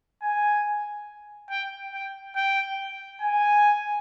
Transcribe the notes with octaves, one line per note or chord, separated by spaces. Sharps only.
G#5
G5
G5
G5
G#5